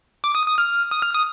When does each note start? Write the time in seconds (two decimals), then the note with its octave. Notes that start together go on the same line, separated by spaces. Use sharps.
0.24 D6
0.35 D#6
0.46 D#6
0.58 F6
0.91 D#6
1.02 F6
1.14 D#6